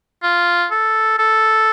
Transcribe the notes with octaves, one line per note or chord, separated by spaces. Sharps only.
F4
A4
A4